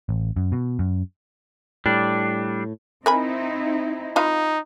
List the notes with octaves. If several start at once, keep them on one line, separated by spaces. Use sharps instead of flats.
A1
F#2
B2
F#2
A2 G3 D4
C4 D#4 E4 A#4 G#5 B5
D#4 F4 B4 F5